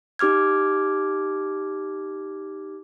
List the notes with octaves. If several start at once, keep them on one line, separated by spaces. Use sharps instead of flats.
D#4 G4 D6 F6 G#6